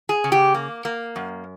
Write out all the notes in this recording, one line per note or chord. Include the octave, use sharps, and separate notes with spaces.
G#4
C#3
G4
A#3
A#3
F#2